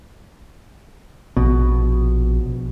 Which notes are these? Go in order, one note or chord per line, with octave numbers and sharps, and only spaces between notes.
A#1 B2